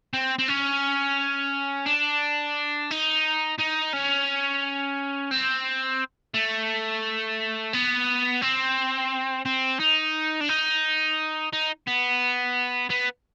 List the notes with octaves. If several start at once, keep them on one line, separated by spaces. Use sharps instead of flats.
C4
C4
C#4
D4
D#4
D#4
C#4
C4
A3
B3
C4
C4
D#4
D4
D#4
D#4
B3
B3